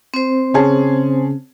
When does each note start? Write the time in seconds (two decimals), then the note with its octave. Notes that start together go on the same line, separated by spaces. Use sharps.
0.14 C4 C5
0.54 C#3 C#4 G#4 A5